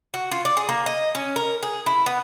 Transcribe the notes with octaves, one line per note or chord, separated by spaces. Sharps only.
F#4
F4
D5
G#4
A#3
D#5
C#4
A#4
G#4
E4
B3